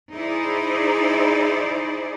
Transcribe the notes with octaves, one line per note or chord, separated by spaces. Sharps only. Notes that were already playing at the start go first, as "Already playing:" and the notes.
D#4 E4 G#4 C5 D5